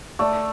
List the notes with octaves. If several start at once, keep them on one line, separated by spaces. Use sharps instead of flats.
A3 D5